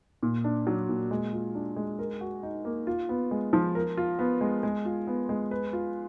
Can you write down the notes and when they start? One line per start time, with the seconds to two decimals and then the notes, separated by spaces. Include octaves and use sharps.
0.23 A#2
0.44 D4
0.67 F#3
0.89 A#2
1.11 G#3
1.33 F4
1.55 D4
1.76 G#3
1.99 A#4
2.21 F#4
2.43 D#4
2.65 A#3
2.87 F4
3.09 B3
3.31 G#3
3.53 F3
3.75 A#4
3.97 F4
4.19 B3
4.41 G#3
4.63 G#3
4.85 F4
5.07 B3
5.29 G#3
5.51 B4
5.73 F4